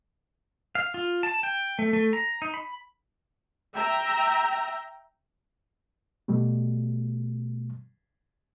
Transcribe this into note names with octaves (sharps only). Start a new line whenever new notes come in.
F5
F4
A5
G5
A3
A3
A#5
D#4
B5
E5 G5 A#5
B2 G3 A3